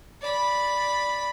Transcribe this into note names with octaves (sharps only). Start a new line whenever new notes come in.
D5 B5